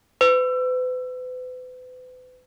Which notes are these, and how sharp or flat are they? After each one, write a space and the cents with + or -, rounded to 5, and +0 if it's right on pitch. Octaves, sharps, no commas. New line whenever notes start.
B4 +40